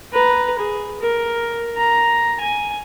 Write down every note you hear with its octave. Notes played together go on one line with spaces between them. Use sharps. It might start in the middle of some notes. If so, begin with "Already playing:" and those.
B4 A#5
G#4
A#4
A#5
G#5